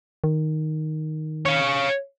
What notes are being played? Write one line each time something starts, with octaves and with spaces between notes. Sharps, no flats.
D#3
C#5 F5